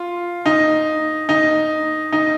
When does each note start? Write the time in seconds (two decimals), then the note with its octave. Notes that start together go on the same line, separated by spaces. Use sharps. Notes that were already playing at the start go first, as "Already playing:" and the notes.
Already playing: F4
0.46 D#4
1.29 D#4
2.12 D#4